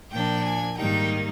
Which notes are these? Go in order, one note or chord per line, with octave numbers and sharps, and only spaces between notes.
A#2 F3 A#3 D4 G5
G#5
G#2 D#3 G3 A#3 D#4 G5